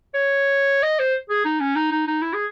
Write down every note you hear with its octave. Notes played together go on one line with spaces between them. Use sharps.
C#5
D#5
C5
G#4
D#4
C#4
D#4
D#4
D#4
E4
G#4